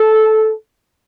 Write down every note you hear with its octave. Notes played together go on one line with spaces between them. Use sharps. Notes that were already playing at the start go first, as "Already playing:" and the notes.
Already playing: A4